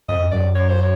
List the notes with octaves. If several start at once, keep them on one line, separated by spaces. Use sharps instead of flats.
F2 D#5
F#2 D5
C#5
C5
C#5